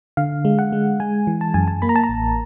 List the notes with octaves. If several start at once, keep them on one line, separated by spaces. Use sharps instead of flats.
D3 F5
G#3
F#5
G#3
G#3 G#5
E3
A5
F#2 G#5
A5
A#3 B5
A#5
A5
A#5
A1